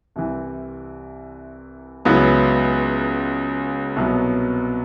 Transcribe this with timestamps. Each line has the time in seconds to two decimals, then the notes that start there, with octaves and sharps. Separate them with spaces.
0.16 C2 C3 E3
2.05 C#2 C#3 F#3 B3 E4
3.96 C2 B2 F#3 B3